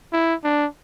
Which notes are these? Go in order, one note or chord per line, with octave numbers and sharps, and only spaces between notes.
E4
D4